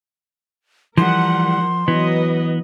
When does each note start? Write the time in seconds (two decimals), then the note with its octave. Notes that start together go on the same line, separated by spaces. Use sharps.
0.98 E3 F3 G3 A#4 F#5 C6
1.88 E3 F#3 B3 B4 D#5